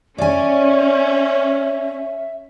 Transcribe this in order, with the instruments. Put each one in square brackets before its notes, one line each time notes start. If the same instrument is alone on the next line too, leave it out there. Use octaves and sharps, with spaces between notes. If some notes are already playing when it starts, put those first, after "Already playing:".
[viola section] C#4 [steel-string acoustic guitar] D5 G#5 [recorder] E5